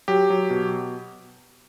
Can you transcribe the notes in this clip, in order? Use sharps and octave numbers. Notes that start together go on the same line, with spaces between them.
F#3 G4
F#3
B2